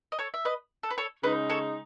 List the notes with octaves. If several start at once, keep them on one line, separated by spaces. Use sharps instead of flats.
D#5
A4 C#5
E5
B4 D#5
A4
B4
A4 C#5
C#3 G#3 D#4 B4 D#5
A4 C#5